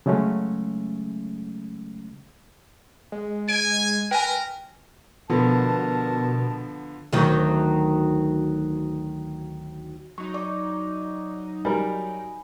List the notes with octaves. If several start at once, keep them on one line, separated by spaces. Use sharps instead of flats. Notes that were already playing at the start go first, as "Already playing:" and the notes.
C#3 F#3 G#3 A3 C#4
G#3
G#5 D7
A#4 B4 G5 G#5
B2 D3 F3 B3 A#4 A5
D2 D#3 F#3
F#3 D#4 C#6
D5 C#6 D6
G3 A#4 G#5 B5